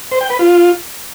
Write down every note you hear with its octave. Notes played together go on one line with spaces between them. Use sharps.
C5
G5
B4
F4